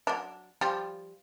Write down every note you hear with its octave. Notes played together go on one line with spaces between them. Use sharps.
F#3 D4
F3 G3 F4